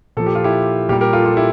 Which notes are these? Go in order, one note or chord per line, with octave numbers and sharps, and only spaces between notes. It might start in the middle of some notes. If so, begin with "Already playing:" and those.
A#2 F3 A4
G4
F4
E4 G4
A#2 G3 G4 A#4
G4 A#4
F4 A4
F4 A4
E4 G4